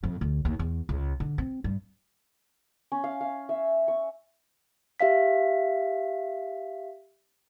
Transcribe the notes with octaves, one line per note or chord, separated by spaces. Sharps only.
F2
D2
D#2
E2
C#2
D3
C4
G2
C#4
F5
F5
E5
C#6
G4 E5 F5 B6